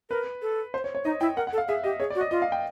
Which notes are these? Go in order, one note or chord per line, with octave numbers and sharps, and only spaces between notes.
A#4 B4
A4
C5
C#5
C#5
D#4 D#5
E4 G5
A#4 F#5
F#5
A4
F5
G#4 E5
G4 D#5
G#4 C#5
D5
F#4
D#5
F4 D#5
F5
G5